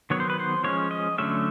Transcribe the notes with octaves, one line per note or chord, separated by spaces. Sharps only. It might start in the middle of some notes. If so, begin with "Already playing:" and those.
D#3 F#3 B3 C#5
C5
B4
C5
F3 G#3 C#4 C#5
D#5
D3 F#3 A3 C#4 E5